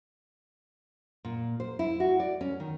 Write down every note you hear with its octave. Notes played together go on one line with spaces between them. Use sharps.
A#2
C5
E4
F#4
D5
C#4
D#3